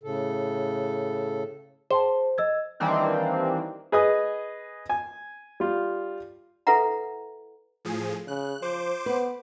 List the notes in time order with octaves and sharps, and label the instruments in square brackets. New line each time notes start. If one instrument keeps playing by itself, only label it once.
[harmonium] A2 C#3 A4
[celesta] G#4 G5 A5 [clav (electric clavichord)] C5
[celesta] D#5 E6 G#6
[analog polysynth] D#3 E3 G3 A#3 C4 D4
[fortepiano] G#4 B4 D#5 G#5 D#6
G#5
G3 F4
[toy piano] E4 A4 B4 E5 F#5 A#5
[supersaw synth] A2 F3 G#4
[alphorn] C#3 [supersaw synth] F#6
[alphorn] F3 [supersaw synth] C5 D6
[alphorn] B3 [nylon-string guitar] B4